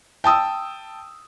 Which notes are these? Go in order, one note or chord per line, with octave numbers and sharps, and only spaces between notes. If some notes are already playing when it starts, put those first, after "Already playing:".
G5 A5 D#6 E6